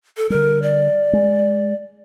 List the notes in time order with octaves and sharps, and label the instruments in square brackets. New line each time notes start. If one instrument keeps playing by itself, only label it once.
[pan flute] A4
[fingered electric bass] D3 G3 [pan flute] A#4
[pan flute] D5
[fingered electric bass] G#3